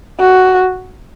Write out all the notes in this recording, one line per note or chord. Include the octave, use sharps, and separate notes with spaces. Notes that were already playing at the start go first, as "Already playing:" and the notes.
F#4